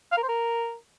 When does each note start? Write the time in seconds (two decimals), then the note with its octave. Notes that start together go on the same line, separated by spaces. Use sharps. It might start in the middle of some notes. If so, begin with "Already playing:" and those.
0.12 F5
0.17 A#4
0.23 C5
0.28 A#4